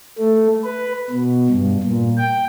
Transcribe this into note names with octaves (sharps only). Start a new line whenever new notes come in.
A3
B4
B2
G2
A#2
G5